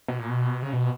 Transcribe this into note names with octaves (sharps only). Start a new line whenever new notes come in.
B2
A#2
B2
C#3
B2